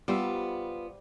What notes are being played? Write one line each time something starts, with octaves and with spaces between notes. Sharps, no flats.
G3 B3 F4 C5 E5